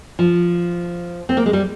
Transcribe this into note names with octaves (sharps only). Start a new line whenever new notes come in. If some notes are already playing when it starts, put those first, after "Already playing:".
F3
C4
A#3
G#3
G3